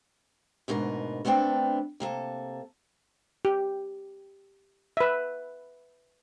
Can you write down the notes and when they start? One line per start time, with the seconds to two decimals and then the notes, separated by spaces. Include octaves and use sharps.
0.68 D2 G#2 B2 A#4 B4
1.25 A3 B3 C4 D4 G5
2.00 C3 A#3 A4
3.45 G4
4.97 B4 E5